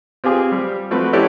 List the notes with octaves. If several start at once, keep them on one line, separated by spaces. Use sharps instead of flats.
C4 F4 G4 G#4
G3
F3 A3 C4 F#4 B4
C4 C#4 E4 G4 A4 D5